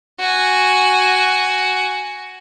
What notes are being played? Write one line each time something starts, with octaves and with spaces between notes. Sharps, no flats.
F#4 G#5